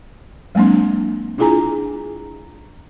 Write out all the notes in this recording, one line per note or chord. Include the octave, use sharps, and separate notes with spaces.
F#3 G#3 A#3 C4 D4
D4 E4 F4 G#4 G#5 A#5